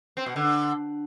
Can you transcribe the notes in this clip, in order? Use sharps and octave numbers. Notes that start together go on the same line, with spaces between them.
C4
B2
D3